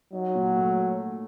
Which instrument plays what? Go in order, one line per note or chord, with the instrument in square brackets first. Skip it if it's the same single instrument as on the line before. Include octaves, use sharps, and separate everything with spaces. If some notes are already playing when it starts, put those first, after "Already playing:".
[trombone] F#3 [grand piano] D#4
[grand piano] A#2
A3